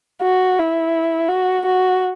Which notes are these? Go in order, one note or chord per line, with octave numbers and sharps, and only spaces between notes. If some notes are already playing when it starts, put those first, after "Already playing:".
F#4
E4
F#4
F#4